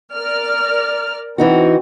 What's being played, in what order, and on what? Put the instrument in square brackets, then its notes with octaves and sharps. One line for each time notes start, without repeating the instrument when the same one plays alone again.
[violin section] A#4 D5 F6
[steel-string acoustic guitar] E3 D#4 F#4 [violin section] C4